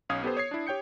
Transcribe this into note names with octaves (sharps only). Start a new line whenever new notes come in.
B1 C#4 F5 D#6 G#6
B3 G4 A4 B4 C5
C#5 D#6 G#6 C7
D4 E4
G4 C#5 G5 G6 C#7